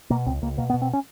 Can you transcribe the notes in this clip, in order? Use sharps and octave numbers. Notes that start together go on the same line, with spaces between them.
B2 A#3
C#2 C4
C#2 A#3
B2 A#3
B3
B2
C4
C#4